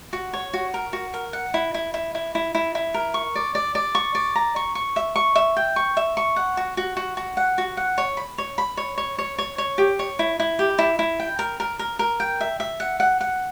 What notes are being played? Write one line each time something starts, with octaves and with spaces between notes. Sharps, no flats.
F#4
C#5
F#4
A#4
F#4
A#4
F#5
E4
E4
E4
E4
E4
E4
E4
A#4
C#6
D5
D5
D5
C#6
D5
A#5
C#6
C#6
E5
C#6
E5
G5
C#6
E5
C#6
F#5
F#4
F#4
F#4
F#4
F#5
F#4
F#5
C#5
B5
C#5
B5
C#5
C#5
C#5
C#5
C#5
G4
C#5
E4
E4
G4
E4
E4
G5
A#4
A#4
A#4
A#4
G5
E5
E5
F#5
F#5
F#5